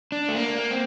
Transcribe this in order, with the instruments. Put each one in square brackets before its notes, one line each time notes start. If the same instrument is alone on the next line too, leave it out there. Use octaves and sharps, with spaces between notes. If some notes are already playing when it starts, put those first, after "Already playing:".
[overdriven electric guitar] D4
A3
A#3
C4